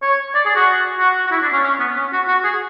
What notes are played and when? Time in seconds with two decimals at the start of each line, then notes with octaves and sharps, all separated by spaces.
0.02 C#5
0.35 D5
0.46 G#4
0.55 F#4
0.99 F#4
1.27 F#4
1.31 E4
1.43 D4
1.53 C#4
1.64 C#4
1.79 B3
1.96 C#4
2.13 F#4
2.28 F#4
2.44 G#4